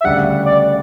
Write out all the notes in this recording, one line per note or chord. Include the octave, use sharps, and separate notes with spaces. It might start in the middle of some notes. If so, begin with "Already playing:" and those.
E5
D2 C#3 G3 D4 G4 F#5
D5